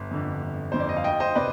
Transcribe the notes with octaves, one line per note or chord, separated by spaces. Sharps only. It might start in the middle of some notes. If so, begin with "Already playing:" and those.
Already playing: G1
F2 D3
G1
F2 D3 C5
D5
D#5
F5
D2 D#5 G5
C5 D#5
C3 B4 D5